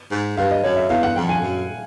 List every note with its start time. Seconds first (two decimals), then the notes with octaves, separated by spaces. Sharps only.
0.11 G#2
0.37 G2 F5
0.51 D#5
0.63 F#2 C#5
0.76 E5
0.89 E2 F5
1.03 F#5
1.16 F2 G5
1.29 G#5
1.42 F#2